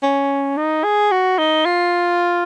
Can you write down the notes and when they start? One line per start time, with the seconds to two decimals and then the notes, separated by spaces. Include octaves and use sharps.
0.03 C#4
0.57 D#4
0.84 G#4
1.11 F#4
1.38 D#4
1.66 F4